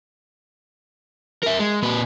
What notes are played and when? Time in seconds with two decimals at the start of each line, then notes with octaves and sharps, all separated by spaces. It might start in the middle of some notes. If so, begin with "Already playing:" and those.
1.43 A#4 E5
1.59 G#3
1.83 A#2 B4